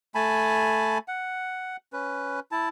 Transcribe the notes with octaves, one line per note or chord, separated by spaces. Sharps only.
A3 G#5 A5 B5
F#5
C#4 B4
E4 A5